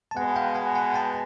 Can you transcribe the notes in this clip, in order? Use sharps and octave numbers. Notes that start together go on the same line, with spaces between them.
A5
B2 G#3 B3 F#5 G#5
F5 G5
F#5 G#5
F#5 G#5
G5 A5